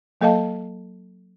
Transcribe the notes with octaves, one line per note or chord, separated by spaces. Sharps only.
F#3 A#3 A4 D#5 F5 A5